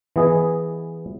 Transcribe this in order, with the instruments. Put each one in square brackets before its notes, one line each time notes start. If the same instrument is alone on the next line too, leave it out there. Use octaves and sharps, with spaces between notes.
[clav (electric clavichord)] E3 B3 G#4 D#5 G#5